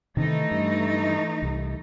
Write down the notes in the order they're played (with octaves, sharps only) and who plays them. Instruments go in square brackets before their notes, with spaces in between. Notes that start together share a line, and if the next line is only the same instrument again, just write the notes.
[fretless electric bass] C3 D#3 C4 [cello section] E3 A3 D#4
[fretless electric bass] G2
C2